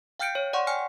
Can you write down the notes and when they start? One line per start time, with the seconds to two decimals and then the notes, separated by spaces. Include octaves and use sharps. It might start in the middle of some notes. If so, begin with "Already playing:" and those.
0.19 F5 G5 F6 G6 C#7 D7
0.35 C#5
0.53 D5 F#5 C6 C#6
0.67 G5 G#5 F6 C#7